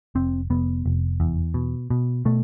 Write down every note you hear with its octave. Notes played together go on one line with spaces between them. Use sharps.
F1 C4
F1 B3
F1
E2
B2
B2
B2 A3